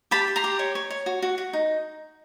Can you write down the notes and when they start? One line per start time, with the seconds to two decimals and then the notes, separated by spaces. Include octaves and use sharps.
0.11 G4 A5 B5
0.28 G4
0.36 A#5 C6
0.44 G4
0.59 C#5
0.75 C#5
0.90 C#5
1.06 F#4
1.22 F#4
1.38 F#4
1.53 D#4